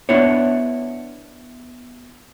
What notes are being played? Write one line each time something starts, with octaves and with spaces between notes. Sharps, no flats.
B3 D4 E4 C#5